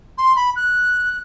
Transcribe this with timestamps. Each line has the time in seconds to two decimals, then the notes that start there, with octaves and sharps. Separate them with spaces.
0.18 C6
0.36 B5
0.56 F#6